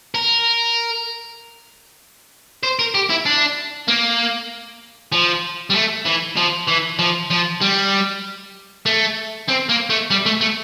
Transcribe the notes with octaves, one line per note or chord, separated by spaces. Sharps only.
A#4
C5
A#4
G4
E4
D4
A#3
F3
G3
A3
E3
F3
E3
F3
F3
G3
A3
C4
A#3
A3
G3
A3
A3